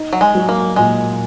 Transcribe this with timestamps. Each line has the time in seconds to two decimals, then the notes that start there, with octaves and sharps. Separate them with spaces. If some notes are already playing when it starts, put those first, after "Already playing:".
Already playing: D#4
0.13 F#3
0.21 G#3
0.35 F#3
0.49 A#3
0.76 A#2 G#3